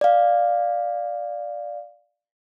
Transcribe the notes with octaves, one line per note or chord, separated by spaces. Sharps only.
D5 F5